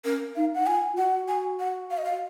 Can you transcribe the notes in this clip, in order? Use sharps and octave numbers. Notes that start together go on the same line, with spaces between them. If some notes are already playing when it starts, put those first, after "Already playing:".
C#4 A#4
D#4 F5
F#5
F4 G#5
F4
F#4 F#5
G#5
F#5
F5
D#5
F5